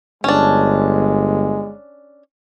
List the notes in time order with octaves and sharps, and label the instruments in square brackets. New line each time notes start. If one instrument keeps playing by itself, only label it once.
[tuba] G1 [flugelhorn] G#3 [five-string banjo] C#4 D4